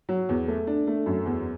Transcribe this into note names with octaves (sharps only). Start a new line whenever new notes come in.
F#3
E2
A3
D4
A3
F#2
E2